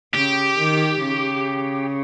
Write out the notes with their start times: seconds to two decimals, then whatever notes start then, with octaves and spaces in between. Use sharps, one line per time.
0.14 C#3 G4
0.58 D#3
1.02 C#3